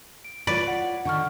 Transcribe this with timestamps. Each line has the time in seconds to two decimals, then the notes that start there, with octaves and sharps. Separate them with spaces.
0.25 D7
0.47 F4 B4 C#5 D5
0.68 F#5
1.05 D3 D#3 F#5 C#6 F6